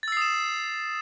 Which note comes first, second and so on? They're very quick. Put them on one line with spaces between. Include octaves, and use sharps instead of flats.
A6 E6 C7 D#6 E7